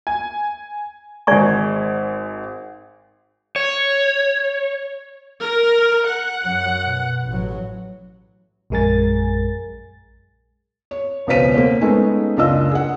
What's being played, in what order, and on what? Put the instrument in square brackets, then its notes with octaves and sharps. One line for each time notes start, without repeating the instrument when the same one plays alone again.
[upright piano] G#5
[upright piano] G#1 G#3 [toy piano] D5 G#5 C#6
[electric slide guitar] C#5
[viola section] A#4
F#5
[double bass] F#2 F#3
B2
A1 F#3
[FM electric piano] A#1 F#2 G#3 A#4 G#5 A6
[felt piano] C#5
E1 C#2 B3 C5 B6 D#7
A#3 C5
G#3 A3 B3 C#4 D#4 G#4
F#1 C#2 D4 F4 D#5 E6
G#4 F#5